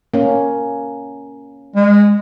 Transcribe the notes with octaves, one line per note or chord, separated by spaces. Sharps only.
A#3 C#4
G#3